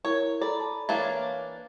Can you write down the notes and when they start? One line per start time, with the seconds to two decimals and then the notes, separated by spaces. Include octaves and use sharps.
0.05 E4 A#4 C#5
0.41 A4 D5 A#5 B5
0.60 A5
0.89 E3 A#3 D4 C#5 F5 A6